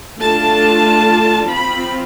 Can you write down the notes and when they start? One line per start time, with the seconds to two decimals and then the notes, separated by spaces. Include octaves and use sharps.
0.18 A3 D4 F4 A5
1.49 F3 C4 F4 B5